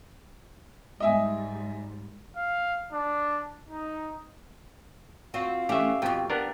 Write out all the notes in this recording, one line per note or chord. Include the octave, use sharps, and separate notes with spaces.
G#2 G3 G#3 D#5 E5 G#5
F5
D4
D#4
C4 F4 F#4 F5
E3 A3 C#4 G4 E5
F2 B2 F4 G4
B3 D4 A#4